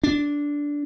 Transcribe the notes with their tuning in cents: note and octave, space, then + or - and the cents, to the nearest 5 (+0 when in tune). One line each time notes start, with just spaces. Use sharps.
D4 -10